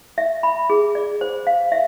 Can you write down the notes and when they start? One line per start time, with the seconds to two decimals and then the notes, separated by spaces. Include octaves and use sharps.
0.18 E5
0.43 B5
0.70 G#4
0.95 D5
1.21 C5
1.47 F5
1.72 E5